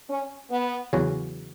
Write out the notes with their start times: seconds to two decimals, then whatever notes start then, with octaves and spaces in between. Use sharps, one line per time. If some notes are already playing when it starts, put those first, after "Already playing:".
0.09 C#4
0.51 B3
0.93 E2 C#3 F#3 C#4 F#4